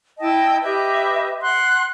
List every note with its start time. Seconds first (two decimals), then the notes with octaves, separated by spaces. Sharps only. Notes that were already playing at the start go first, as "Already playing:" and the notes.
0.19 E4 D#5 G5 A5
0.63 G4 B4 D#5 E5
1.42 F#5 C6 F#6